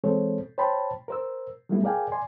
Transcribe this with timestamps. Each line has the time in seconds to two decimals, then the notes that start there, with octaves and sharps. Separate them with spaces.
0.04 E3 G#3 C4 A4 C5 C#5
0.58 C5 C#5 G5 A5 B5 C6
1.08 A#4 C5 E6
1.69 F#3 G3 A3 B3 E4
1.83 G#4 A#4 D5 F5 G5 G#5
2.12 D5 G#5 C6